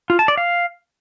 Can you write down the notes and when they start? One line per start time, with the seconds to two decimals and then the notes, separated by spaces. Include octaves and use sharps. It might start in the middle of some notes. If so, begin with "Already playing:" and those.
0.10 F4
0.19 A5
0.28 D5
0.37 F5